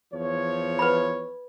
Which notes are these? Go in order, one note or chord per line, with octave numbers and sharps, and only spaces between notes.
E2 F3 C#5
B4 B5